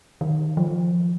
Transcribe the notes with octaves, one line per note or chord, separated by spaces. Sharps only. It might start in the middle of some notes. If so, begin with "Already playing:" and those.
D#3
F3